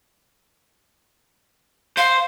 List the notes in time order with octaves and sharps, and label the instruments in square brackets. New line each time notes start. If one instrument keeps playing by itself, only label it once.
[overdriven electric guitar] C5 [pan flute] F5